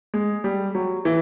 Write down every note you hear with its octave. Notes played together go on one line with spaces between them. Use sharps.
G#3
G3
F#3
E3